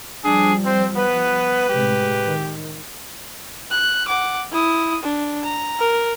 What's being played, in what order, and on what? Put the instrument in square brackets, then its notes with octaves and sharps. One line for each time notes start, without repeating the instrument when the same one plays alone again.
[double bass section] F3 G3 [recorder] D4 [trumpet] G#4
[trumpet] C4 [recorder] C5
[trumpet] B3 [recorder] B4
[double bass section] A2 C3 G#3 [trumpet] G4
[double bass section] D#3
[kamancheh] F#6
F#5 D6
E4 D#6
D4
A#5
A#4